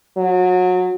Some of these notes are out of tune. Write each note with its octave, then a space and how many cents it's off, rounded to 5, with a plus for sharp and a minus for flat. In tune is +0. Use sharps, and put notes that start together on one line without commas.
F#3 -25